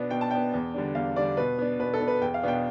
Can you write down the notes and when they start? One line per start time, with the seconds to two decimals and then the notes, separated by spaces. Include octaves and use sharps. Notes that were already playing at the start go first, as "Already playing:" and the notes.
Already playing: B2 B3 D4
0.11 B2 G5
0.21 A5
0.31 B3 D4 G5
0.54 E2
0.74 D3 G3 D4
0.95 E2 F5
1.16 D3 G3 D4 D5
1.37 B2 B4
1.58 B3 D4
1.79 B2 B4
1.94 A4
2.00 B3 D4
2.08 B4
2.21 E2 G5
2.34 F5
2.43 B2 B3 D4 G5